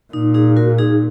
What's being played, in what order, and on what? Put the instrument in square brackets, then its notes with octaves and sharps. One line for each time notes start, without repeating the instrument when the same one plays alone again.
[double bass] A#2 [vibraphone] D#4
[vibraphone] D#4 G#4
F#4 A#4
D#4 G#4